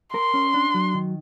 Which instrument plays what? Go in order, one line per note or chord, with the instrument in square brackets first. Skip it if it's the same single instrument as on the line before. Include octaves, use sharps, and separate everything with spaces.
[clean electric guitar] A#4 [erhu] C6
[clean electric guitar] C#4
D4
F#3
D#3